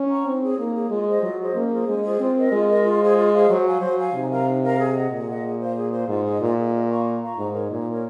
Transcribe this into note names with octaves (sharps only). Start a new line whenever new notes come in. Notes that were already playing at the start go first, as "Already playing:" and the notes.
Already playing: C#4
F#5 A#5 C#6
C4 D#4
G#4 C#5
A#3 D#4
G#4 C#5
G#3 F4
G#4 C5 D#5
F#3 F4
G#4 C5 D#5
A#3 C#4
F4 G#4 C5
G#3 C#4
F4 G#4 C5
C4 F4
A#4 D#5
G#3 F4
A#4 D#5
F4
G#4 C5 F5
F4
G#4 C5 F5
F#3 C5
F5 G#5
F#3 C5
F5 G#5
C3 D#4
A#4 F5 A#5
D#4
A#4 F5 A#5
G#4
D#5 F#5
A#2 G#4
D#5 F#5
G#4
C5 F5
G#4
C5 F5
G#2 F4
G#4 D#5
A#2 F4
G#4 D#5
A#4
F5 A#5 C#6
A#4
F5 A#5 C#6
G#2 D#4
A#4 C#5
A#2 D#4
A#4 C#5